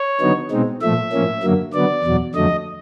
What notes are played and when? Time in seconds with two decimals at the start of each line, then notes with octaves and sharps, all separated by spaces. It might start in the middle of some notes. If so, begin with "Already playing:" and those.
Already playing: C#5
0.20 D3 F#3 B3 D#4
0.51 B2 G#3 C4 D#4
0.81 A#2 F3 A3 E5
1.12 A2 F3 A#3 C#4
1.43 F#2 D3 F#3 A#3
1.73 D3 F#3 B3 D5
2.03 E2 B2 F#3
2.34 F2 D3 F#3 A3 D#5